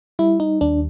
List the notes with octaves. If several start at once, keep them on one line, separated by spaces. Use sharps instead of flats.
G3 E4
D#4
D#2 D4